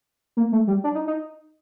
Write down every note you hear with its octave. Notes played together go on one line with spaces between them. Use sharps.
A#3
A3
G3
D4
D#4
D#4